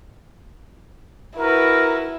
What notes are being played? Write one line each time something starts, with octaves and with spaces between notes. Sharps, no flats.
E4 F#4 A#4 B4